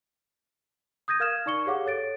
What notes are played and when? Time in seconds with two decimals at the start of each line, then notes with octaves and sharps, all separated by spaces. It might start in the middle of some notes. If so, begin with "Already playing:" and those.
1.08 D#6 G6 G#6 A#6 D#7
1.20 A#4 F5 F6 G#6 E7
1.46 D#4 D5 C#6 C#7 G7
1.66 G4 G#4 C#5 F5 F#5 D6
1.86 A4 C#5 A6 D7